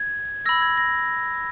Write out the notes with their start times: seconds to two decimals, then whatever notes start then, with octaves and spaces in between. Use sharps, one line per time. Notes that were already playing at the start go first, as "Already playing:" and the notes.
Already playing: G#6
0.46 B5 E6 A#6
0.62 G#6
0.77 A#6